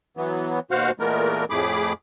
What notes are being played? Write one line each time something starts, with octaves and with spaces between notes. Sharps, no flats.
E3 F#3 B3
D#2 B2 F#4 C5 F5 F#5
A#2 E3 G#3 A3 B3 A#4
F2 A2 A3 G#4 B5 D6